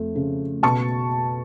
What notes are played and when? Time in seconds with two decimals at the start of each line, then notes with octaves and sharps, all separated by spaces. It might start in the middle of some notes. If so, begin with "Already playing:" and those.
Already playing: F2 A3
0.15 C#3
0.63 B2 A5 C#6